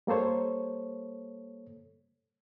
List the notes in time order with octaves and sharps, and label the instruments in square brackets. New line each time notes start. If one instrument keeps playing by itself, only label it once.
[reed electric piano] G3 A#3 A4 C5 C#5